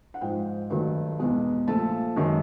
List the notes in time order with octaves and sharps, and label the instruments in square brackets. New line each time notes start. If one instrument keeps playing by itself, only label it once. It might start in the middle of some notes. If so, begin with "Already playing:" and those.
[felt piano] F#5
G#2 F3 G#3 G5
G2 D#3 F#3 A3
E2 B2 G#3
A#2 F3 A3 A5
F#2 D#3 G#3